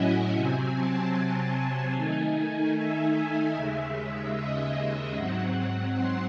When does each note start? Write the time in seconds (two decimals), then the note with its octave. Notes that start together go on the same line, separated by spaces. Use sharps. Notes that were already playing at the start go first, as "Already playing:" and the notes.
Already playing: A2 F#3 C#4 E4 D#5 E5 F#5 G#5
0.35 C3 F#3 C4
0.75 A5
1.55 G#5
1.96 D#3 A3 D#4
2.76 E5
3.55 D#2 C#3 G#3
4.37 D#5
4.76 E5
5.16 G#2 F#3 C4 F#5
5.96 C6